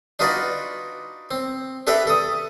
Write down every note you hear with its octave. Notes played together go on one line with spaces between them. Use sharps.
D4 D#4 F4 F#4 B4 D5
C4
D4 G4 A4 B4 D5 E5
A4 D#6